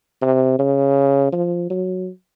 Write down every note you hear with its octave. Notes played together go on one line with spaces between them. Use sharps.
C3
C#3
F3
F#3